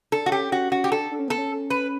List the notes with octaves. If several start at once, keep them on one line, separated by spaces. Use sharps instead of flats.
D4 A4
F#4
C#4 G4
C#4 F#4
C#4 F#4
G4
D4 A4
D4
C#4
B3 A4
C#4
B4